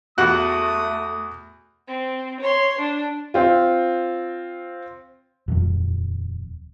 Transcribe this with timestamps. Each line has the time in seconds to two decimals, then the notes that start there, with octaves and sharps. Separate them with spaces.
0.18 E2 A3 F#4 D#6 F#6
1.88 C4
2.41 C#5 C6
2.79 D4
3.34 C4 F4
5.48 D#1 F2